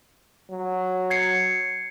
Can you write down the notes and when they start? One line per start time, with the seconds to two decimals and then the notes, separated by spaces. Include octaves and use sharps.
0.51 F#3
1.10 G#6 C7 C#7